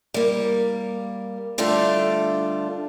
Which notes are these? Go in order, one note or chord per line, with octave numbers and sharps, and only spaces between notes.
G3 A#3
D3 G3 A3 D4 F4